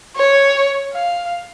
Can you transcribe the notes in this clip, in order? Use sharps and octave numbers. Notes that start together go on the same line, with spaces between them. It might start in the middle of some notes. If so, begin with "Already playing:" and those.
C#5
F5